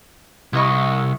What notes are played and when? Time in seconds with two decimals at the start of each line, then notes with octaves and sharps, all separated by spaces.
0.53 C2 E4 D#5 C#6